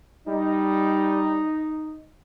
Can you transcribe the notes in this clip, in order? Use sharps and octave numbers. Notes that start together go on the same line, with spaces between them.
G3 D#4